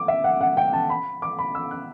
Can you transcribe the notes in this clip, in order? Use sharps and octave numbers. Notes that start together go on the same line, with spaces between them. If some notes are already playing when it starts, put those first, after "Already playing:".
Already playing: D6
E5
F#5
F#5
G5
A5
B5
D6
B5
E6
F#6